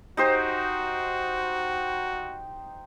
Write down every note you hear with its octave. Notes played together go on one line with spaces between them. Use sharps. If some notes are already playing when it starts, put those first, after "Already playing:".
D#4 F#4 G4 C5